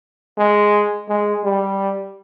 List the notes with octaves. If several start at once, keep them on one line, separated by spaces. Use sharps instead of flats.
G#3
G#3
G3